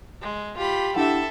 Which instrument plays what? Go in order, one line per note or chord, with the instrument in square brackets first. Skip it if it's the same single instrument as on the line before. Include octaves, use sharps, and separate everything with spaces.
[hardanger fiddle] G#3
[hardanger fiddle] F4 B5 [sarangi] G4
[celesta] D4 E4 F#5 [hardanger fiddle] A4 E5